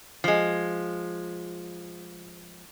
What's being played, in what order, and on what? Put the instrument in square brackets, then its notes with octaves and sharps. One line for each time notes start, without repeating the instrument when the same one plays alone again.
[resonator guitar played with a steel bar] F3 G#3